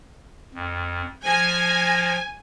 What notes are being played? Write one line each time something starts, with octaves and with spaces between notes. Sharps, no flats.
F2
F3 G#5 A#6